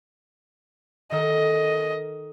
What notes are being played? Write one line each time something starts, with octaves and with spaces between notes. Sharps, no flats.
D#3 A4 A#4 D#5